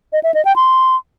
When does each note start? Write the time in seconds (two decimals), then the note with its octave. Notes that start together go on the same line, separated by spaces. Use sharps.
0.13 D#5
0.24 E5
0.34 D#5
0.45 G5
0.56 C6